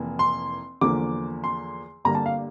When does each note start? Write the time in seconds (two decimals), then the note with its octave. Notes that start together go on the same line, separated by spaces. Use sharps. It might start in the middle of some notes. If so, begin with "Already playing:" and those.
Already playing: F1 E3 A#3
0.19 C6
0.81 E2 D3 F3 A#3 D6
1.44 C6
2.05 G1 G2 D3 G3 A#3 A#5
2.15 A5
2.26 F5